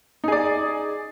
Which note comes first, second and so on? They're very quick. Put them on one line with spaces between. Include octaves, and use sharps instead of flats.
D#4 G#4 D5